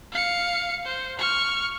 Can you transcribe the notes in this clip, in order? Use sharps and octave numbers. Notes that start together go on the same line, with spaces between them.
F5 C#7
C5
C#6 F6